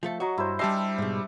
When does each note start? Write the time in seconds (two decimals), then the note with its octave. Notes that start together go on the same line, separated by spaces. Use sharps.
0.03 F3 A3 A4
0.20 F#3 F#4 D#5
0.38 G2 E4 C5
0.59 G3 D4 G4 D#5 E5 G#5 A5 C7
0.98 G#2 B2